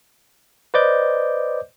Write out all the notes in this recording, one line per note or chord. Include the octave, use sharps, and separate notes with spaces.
B4 C5 D5 D#5 D6 G6